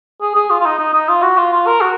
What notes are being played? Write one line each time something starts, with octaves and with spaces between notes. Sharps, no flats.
G#4
G#4
F4
F4
D#4
D#4
D#4
F4
F#4
F4
F4
A#4
F#4